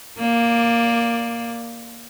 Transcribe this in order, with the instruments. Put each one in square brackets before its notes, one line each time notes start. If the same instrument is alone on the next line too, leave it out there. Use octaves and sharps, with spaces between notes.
[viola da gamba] A#3 D5